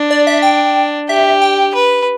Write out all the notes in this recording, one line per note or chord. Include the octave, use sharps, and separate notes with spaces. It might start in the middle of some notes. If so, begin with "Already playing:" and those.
Already playing: D4
D5
E5
G5
G4 E5
G5
B4